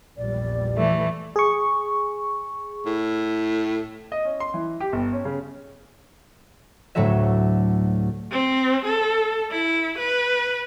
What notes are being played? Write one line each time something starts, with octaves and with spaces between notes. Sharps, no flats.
A#1 E2 G3 D5
E3 A3
G#4 C#6
A2
D#5
C#4
C6
E3
G4
G1
C#4
C#3
D2 A2 F#3 A3 F#4 E5
C4
A4
E4
B4